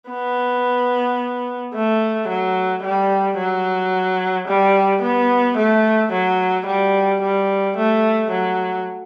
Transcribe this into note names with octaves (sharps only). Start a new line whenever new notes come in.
B3
A3
F#3
G3
F#3
G3
B3
A3
F#3
G3
G3
A3
F#3